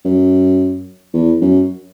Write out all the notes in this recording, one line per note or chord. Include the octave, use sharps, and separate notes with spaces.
F#2
E2
F#2